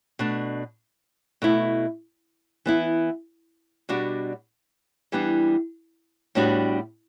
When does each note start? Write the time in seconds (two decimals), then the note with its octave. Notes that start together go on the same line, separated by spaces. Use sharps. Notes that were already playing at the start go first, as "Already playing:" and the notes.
0.19 B2 A3 D4
1.42 B2 A3 E4
2.66 E3 B3 E4
3.89 B2 G3 D4 F#4
5.12 E3 G3 B3 D4
6.35 A2 G3 B3 D4 F#4